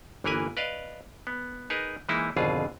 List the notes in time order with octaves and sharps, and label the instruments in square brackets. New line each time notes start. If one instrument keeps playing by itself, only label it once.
[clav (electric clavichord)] G1 E3 A#3 A#4 B4 G#5
B4 D5 D#5 F5
B3
D#4 G#4 A#4 B4
E3 G#3 A#3 D#4 E4
G#1 F2 B2 D3 F4 G#4